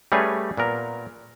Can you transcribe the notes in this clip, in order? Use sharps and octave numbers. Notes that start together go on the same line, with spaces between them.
G3 A3 C#4 G#4 B4 C#5
A#2 B3 A#4